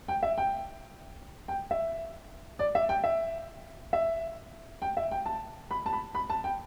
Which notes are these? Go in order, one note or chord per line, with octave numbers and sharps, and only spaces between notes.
G5
E5
G5
G5
E5
D5
E5
G5
E5
E5
G5
E5
G5
A5
B5
A5
B5
B5
A5
G5